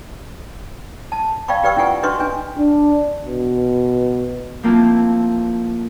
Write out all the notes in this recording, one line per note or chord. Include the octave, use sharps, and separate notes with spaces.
A5
D5 F5 G5 B5 C#6
G4 B4 D5 G5 C#6 E6
C#4 E4 F4 F#5 G#5 C#6
D4 F#4 B4 D#5 C6 C#6
C#4 D4 G#5
D4
B2
F3 A3 A#3 C4 E4 F4